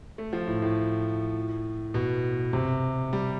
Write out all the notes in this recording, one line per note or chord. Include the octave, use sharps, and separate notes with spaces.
A3
F3
A2
A2
B2
C3
G3